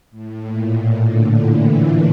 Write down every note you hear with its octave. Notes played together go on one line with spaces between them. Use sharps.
A2
A#2
D3
D3 E3